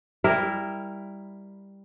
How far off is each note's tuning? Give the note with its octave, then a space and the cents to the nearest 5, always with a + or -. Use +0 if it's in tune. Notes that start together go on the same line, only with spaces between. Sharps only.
G3 +10 E4 +0 A#4 +0